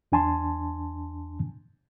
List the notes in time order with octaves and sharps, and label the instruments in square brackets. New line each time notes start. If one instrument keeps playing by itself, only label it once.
[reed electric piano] E2 D4 G#5 A5 C6